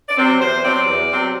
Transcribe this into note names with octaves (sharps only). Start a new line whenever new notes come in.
D5
C3 F#3 C4
D5
E2 C5
C3 F#3 C4 D5
E2
C3 F#3 C4